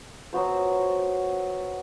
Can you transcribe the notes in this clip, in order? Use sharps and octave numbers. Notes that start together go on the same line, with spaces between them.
F#3 B3 F#4 C5